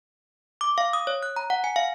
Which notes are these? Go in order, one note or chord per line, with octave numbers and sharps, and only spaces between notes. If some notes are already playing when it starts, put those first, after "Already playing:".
D6
F5
D#6
C#5
F#6
A#5
F#5
G#5
F5